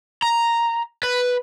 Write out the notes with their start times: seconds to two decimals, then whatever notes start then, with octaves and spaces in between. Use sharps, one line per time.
0.22 A#5
1.03 B4